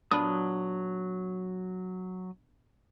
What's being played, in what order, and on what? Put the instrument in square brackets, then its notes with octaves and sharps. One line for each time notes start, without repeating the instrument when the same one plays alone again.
[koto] A#2 B3 D4 [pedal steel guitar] F#3 D#6